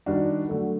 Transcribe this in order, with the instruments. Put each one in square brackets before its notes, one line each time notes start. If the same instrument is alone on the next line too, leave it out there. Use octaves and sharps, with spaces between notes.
[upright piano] D#3 G3 D4 F#4
D3 F#3 A3